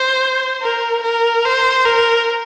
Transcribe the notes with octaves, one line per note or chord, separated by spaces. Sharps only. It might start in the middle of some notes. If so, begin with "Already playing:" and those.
Already playing: C5
A#4
A#4
C5
A#4